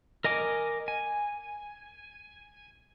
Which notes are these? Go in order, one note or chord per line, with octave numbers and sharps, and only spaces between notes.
A#4 D#5 G#5 D6
G#5